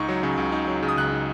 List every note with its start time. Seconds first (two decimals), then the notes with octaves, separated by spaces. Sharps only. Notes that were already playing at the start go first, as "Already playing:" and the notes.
Already playing: C#2 D#4 C#6
0.09 F#3
0.23 C#3
0.38 C#2
0.52 D#4
0.68 F#3
0.83 C#3
0.89 D#6
0.97 C#2 F#6
1.12 D#4